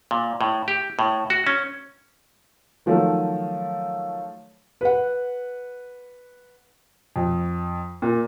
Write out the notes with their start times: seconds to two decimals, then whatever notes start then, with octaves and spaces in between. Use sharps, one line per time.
0.11 A#2
0.41 A2
0.68 G4
0.99 A2
1.30 F#4
1.47 C#4
2.86 D#3 F3 F#3 A3
4.81 B4 F#5
7.16 F2
8.02 A#2